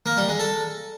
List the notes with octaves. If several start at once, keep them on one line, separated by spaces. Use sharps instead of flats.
A#3
G3
G#3
A4